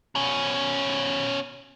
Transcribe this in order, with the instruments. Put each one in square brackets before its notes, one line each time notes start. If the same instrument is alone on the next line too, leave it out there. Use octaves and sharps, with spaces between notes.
[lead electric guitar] B2 C#4